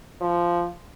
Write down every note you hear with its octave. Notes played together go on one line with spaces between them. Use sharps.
F3